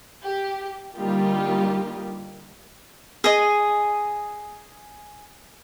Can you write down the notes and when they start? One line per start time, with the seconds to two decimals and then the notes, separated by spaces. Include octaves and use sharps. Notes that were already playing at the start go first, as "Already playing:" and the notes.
0.22 G4
0.96 D3 G3 A#3 D#4 F4 G4
3.24 G#4 D#5